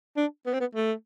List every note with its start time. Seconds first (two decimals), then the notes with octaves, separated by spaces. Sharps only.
0.17 D4
0.46 B3
0.53 C4
0.60 B3
0.75 A3